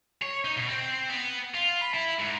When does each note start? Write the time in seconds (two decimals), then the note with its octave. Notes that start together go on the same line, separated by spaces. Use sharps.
0.22 C#5
0.45 D#4
0.57 B2
0.69 C4
1.10 B3
1.54 F4
1.81 B5
1.94 E4
2.19 G#2